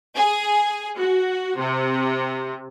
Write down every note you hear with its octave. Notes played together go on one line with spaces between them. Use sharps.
G#4
F#4
C3